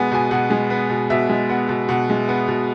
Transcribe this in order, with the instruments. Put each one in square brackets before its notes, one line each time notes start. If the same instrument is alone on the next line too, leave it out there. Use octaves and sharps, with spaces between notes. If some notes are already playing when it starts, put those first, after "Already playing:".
Already playing: [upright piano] B2 G#3 B3 G#5
B2 G#5
B2 F#5
G#3
B3
B2
B2 E5
G#3
B3 F#5
B2
B2 F#5
G#3
B3
B2